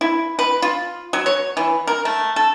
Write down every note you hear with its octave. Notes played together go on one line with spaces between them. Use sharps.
E4
B4
F4
F#3
C#5
E3
A#4
A3
A4